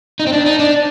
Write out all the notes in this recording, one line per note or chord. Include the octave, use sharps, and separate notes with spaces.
D#4
C4
D4
D#4
D4